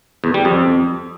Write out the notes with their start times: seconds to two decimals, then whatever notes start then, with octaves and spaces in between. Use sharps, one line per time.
0.24 E2
0.34 G3
0.45 F2